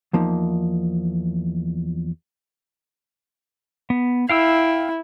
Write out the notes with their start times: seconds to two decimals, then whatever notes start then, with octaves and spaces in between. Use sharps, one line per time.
0.13 E2 F3 A#3 D#4
3.90 B3
4.29 E4 F5 G5 E6